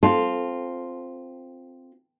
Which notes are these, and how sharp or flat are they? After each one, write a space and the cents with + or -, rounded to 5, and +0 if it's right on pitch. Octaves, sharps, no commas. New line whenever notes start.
C4 +0 F4 +0 A4 -15